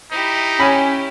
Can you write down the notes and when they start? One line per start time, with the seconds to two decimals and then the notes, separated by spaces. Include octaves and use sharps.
0.12 D#4 E4 G4
0.60 C#4 G#5 B5